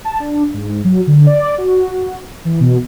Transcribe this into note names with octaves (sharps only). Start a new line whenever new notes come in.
A5
D4
G#2
F#3
D3
D5
F#4
E3
B2